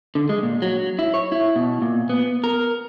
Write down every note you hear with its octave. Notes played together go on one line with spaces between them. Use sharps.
D3
G#3
A#2
F#3
E4
C#5
E4
B2
A#2
B3
A#4